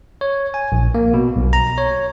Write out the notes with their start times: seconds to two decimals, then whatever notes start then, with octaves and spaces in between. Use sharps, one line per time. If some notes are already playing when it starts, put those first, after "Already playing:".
0.21 C#5
0.54 G#5
0.72 A#1
0.95 A#3
1.14 B2
1.36 B1
1.53 A#5
1.78 C#5